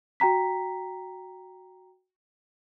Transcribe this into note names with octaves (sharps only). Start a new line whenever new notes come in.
F#4 G5 A#5 B6